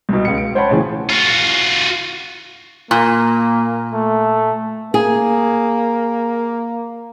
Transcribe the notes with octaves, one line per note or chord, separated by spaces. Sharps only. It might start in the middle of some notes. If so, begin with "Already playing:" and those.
C2 B2
C#2 C#7
D7
C5 C#5 F#5 G5 A5 B5
A2 C#3 E3 F3
F4 F#4
A#2 A#3
A3
A#3 G#4